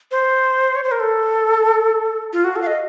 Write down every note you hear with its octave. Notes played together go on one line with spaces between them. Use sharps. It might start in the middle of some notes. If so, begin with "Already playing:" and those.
C5
C#5
C5
A#4
A4
F4
F#4
A4
F5
D#5